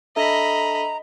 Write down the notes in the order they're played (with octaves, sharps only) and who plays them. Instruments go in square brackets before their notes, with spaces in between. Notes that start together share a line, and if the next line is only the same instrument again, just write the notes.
[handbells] D4 A4 E5 [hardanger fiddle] D#5 B5 [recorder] A#5